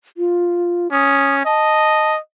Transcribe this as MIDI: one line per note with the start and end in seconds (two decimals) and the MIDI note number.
0.17 0.92 65
0.92 1.41 61
0.92 1.35 87
1.45 2.19 75
1.45 2.12 81